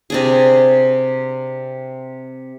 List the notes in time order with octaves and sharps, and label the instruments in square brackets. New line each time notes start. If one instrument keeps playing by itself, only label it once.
[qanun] C3 D4 G#4